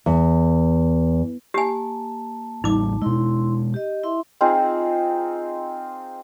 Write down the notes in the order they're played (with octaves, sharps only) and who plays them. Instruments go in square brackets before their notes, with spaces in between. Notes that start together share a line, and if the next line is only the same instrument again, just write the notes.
[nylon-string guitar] E2
[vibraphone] A#3 A5 [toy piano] G4 G#5
[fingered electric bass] A1 G3 [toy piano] D#4 D6
[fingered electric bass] B2 G#3 [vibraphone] E4 C6
[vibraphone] G4 D#5
E4 E5 C6
[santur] C4 D#4 F4 G#4